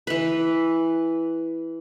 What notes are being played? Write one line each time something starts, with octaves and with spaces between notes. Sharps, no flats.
E3 B4